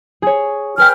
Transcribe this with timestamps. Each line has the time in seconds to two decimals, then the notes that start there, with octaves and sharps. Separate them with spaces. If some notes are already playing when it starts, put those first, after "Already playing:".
0.22 G#4 C#5
0.78 G#4 B4 G5 F6